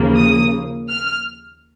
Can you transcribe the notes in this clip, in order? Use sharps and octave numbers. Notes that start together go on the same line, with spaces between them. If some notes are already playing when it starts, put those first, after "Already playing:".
Already playing: D#2 C#3 F3 A#3
D#6
F6